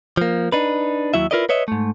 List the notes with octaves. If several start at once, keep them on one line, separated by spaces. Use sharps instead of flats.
F3 A#3
D4 D#4 B4
D#2 F#3 E4 E5
E4 F4 A#4 B4 D5 D#5
B4 C#5 D#5 E5
G#2 A3